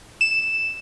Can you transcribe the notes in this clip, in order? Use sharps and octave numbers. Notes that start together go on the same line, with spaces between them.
E7